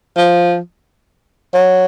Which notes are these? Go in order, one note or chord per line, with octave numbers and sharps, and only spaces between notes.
F3
F#3